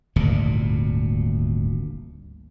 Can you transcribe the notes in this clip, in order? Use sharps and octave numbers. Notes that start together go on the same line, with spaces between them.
D#1 G#1 D2 A#2